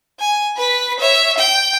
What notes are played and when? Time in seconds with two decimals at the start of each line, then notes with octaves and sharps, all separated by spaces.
0.20 G#5
0.57 B4 B6
0.99 C#5 E5
1.38 G5